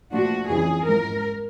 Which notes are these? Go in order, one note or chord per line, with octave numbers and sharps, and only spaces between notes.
A#2 F3 A3 D4 F#4
F2 C#3 E3 G#4
G#2 F3 G#3 A#4